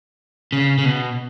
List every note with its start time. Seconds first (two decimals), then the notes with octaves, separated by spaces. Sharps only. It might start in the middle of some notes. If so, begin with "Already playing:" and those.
0.52 C#3
0.78 C#3
0.85 B2